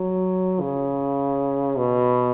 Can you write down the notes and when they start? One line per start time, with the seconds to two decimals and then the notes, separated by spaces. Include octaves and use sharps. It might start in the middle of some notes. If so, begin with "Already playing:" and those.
Already playing: F#3
0.60 C#3
1.78 B2